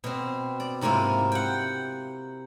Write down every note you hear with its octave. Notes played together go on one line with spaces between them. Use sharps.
B2 C4
D5
G#2 C3 A#3 E4 F4
F#5 G5